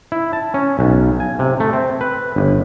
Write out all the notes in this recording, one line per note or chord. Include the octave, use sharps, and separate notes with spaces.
E4
A5
C#4
B1
G#5
C3
A3
C4
B4
G1